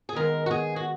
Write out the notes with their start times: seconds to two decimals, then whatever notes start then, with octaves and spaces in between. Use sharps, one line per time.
0.09 G#4
0.15 D#3 G#3 B3 A#4
0.46 F#4
0.51 G#4
0.76 F#4